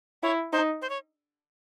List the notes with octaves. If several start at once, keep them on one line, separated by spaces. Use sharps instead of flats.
E4 C#5
D#4 C5
C5
C#5